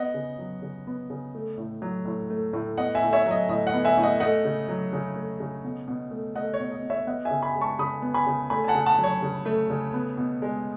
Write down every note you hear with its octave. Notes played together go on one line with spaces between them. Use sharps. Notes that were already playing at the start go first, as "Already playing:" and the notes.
Already playing: B3 D#5 F#5
C#3
F#3
C#3
B3
C#3
A3
A2
F#3
A2
A3
A2
B3 D#5 F#5
E5 G#5
A2
C#5 E5
F#3
D#5
A2 D#5
D#5 F#5
B3
E5 G#5
A2
D#5 F#5
A3 D#5 F#5
C#3
F#3
C#3
A3
C#3
B2
B2
A3
A3 D#5 F#5
C#5
B2
D#5
B2
C#5 E5
B3 D#5 F#5
E5 G#5
C#3
G#5 B5
G#3
A5 C#6
C#3 B5 D#6
B3
G#5 B5
C#3
A3 G#5 B5
G#5
F#5 A5
C#3
F#5 A5
F#3
C#5
C#3
A3
C#3
B3
B2
G#3